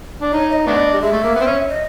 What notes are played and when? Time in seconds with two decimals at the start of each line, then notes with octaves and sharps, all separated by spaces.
0.21 D4
0.32 D#4 C#5
0.49 E5
0.53 D#5
0.66 A3 B3 D4
0.93 G3
1.01 G#3 E5
1.12 A3
1.23 A#3
1.35 B3
1.41 C4
1.46 C#4
1.69 D#5